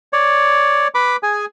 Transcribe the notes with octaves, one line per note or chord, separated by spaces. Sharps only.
C#5 D5
B4 B5 D6
G#4 G#5